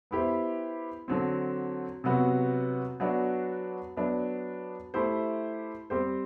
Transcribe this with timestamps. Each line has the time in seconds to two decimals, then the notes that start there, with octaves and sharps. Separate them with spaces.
0.11 B3 E4 G4 C5
1.08 D3 F#3 C4
2.04 C3 F#3 B3 F#4 B4
3.00 F#3 B3 D4 F#4
3.97 F#3 B3 D4
4.94 A3 E4 G4 C5
5.90 G3 C4 G4 C5